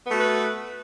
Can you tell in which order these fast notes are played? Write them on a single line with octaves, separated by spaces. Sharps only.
B3 A3 F#4 B4